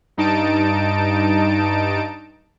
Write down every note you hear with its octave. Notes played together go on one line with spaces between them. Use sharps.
G2 D#4 A5 D7